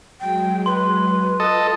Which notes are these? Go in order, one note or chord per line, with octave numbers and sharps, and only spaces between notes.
F#3 G#3 G5
B4 C6
F4 A4 D#5